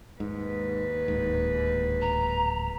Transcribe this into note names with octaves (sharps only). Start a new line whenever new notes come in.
D#2 G#2 B4
D1 G#2
A#5